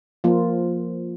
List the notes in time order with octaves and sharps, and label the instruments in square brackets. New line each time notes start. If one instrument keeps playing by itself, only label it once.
[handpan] F3 A#3 F4